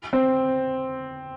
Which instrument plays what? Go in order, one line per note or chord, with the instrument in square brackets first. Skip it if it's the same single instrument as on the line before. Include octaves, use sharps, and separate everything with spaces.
[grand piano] C4